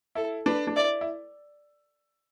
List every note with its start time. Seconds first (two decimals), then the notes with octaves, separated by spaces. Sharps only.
0.15 E4 A4
0.46 D4 B4
0.67 D4
0.76 E4 D5
1.01 E4